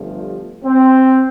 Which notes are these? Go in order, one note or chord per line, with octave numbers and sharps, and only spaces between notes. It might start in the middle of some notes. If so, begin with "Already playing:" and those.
Already playing: G1 G2 F3 A3
C4